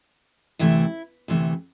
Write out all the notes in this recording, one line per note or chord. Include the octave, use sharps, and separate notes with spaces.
D2 C3 E3 A3 E4
D2 C3 E3 A3